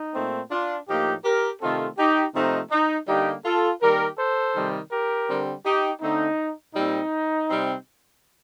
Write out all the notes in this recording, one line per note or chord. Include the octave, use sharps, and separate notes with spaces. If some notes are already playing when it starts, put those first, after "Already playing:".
Already playing: D#4
A#2 A3 C4
D4 F4
A2 F3 A#3 D#4 G4
G4 A#4
C3 D#3 A3 C4 F4 A4
D#4 G4
C3 F3 A3 C4 D#4
D#4
D3 G3 A#3 D#4 G4
F4 A4
D#3 G3 A#3 G4 A#4
A4 C5
C3 D#3 G3
G4 A#4
D3 G3 C4
D#4 G4
D3 A3 C4 D#4
A#2 G3 C4 D#4
C3 G3 C4